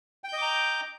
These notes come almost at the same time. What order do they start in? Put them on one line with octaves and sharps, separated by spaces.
G5 G6 D#5 D6 A#5